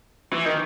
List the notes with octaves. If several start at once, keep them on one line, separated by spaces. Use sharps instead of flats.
E3
D#3